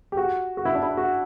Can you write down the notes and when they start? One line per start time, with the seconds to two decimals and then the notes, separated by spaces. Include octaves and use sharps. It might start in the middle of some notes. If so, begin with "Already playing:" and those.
0.12 G4
0.17 F#4
0.57 F#4
0.65 E4
0.75 D4
0.83 E4
0.97 F#4